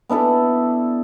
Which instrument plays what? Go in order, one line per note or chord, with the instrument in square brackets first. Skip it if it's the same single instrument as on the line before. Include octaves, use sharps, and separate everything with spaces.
[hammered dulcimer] B3 D4 E4 A4